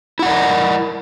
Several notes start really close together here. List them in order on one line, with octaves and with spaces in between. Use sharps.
E4 F#5 D5 A#4